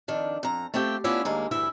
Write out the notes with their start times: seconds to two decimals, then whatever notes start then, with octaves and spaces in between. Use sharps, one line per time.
0.08 F2 D#3 D4
0.43 F2 A#5
0.74 A3 C4 F4 G4 G5
1.04 B3 C#4 D4 E4 F4
1.25 D#2 G#3 A#3
1.51 D2 G2 E3 E4 E5